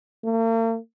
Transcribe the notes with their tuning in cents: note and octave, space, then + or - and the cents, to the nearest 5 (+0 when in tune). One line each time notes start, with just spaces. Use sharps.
A#3 -45